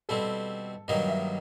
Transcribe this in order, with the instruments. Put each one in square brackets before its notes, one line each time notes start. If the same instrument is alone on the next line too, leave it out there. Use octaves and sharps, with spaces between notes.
[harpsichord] B2 G3 C4 E4 [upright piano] A4
[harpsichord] G2 D#3 F#3 A#3 [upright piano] D#5
[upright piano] E5